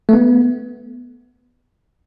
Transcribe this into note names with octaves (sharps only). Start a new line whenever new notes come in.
A3
B3